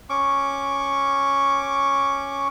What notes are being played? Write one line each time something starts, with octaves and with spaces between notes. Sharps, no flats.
C#4 C#6 D6